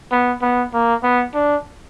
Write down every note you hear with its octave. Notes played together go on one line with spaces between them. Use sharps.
B3
B3
A#3
B3
D4